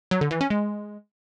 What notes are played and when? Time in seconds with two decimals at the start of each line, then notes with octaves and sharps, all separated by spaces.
0.11 F#3
0.21 D3
0.31 E3
0.41 C#4
0.50 G#3